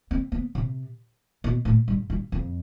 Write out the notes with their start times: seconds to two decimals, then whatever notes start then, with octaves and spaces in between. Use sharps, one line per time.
0.11 C4
0.32 B3
0.55 C3
1.44 B2
1.65 A2
1.88 G2
2.10 G2
2.32 F2